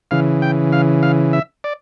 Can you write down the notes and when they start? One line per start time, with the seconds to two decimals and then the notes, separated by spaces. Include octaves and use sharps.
0.11 C#3 E3 F5
0.42 G5
0.72 F5
1.03 F5
1.33 E5
1.64 D5